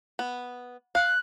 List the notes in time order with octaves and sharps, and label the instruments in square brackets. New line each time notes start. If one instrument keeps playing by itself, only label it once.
[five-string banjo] B3
[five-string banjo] F5 [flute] F#6